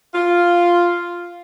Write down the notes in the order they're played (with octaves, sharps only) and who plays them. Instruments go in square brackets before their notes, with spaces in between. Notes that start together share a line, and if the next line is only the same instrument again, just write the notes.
[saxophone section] F4